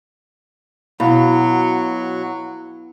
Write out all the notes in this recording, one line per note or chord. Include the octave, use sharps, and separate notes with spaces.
B2 F#3 E4 F5 B5